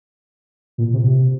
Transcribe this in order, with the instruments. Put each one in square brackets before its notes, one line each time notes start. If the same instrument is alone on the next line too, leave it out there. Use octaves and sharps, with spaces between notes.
[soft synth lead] A#2
C3